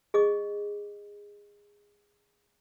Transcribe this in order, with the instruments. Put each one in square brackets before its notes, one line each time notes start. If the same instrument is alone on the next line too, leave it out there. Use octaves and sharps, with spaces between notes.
[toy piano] G#4 D#5 D6